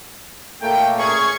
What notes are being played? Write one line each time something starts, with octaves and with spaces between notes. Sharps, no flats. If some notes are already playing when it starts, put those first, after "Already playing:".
A#2 A3 A#3 G5
A1 C#4 G#4 C#6 G#6